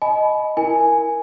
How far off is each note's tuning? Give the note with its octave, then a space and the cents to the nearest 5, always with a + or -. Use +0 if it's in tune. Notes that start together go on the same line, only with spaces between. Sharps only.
D#5 +0 G#5 +45 B5 +0
E4 +0 A#4 +10 G#5 +0